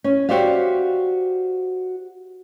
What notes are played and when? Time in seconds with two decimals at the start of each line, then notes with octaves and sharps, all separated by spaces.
0.04 C#4
0.29 F#4 G4 C5 D5 E5 F5